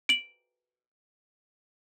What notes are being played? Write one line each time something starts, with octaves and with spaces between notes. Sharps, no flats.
D7 F#7